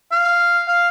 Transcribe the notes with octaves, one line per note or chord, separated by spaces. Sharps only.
F5
F5